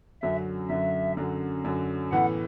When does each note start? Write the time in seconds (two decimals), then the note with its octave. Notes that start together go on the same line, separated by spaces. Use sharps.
0.22 F#2 D3 F#3 E5
0.69 F#2 D3 F#3 E5
1.17 F#2 D3 F#3
1.64 F#2 D3 F#3
2.12 A2 E3 B3 F#5